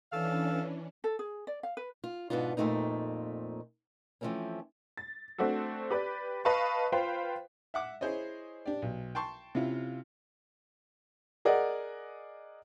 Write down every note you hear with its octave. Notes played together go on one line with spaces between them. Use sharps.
E3 C#4 D4 A4 F5
A4
G#4
D5
F5
B4
F4
G#2 B2 B3 D4 F4
F2 A#2 C#3 A3 C4 D#4
E3 F3 G3 A3 C4 C#4
A6
A3 C4 D4 F#4 A4
G4 B4 D5
B4 D#5 F5 A5 C#6
F4 B4 C5 F5 G5
E5 F#5 D6
E4 G#4 C5 C#5 D#5
D4 G4 D5
B1
G5 A5 C6 C#6
C3 C#4 E4 F4
G#4 A#4 D5 D#5 F#5